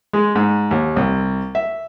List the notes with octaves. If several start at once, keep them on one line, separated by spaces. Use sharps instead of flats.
G#3
G#2
D#2
C2
E5